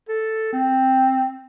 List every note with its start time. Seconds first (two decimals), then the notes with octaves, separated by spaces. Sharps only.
0.09 A4
0.53 C4